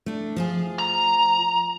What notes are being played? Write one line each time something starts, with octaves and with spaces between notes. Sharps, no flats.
A3 D4
F3 F4 G#4
A#5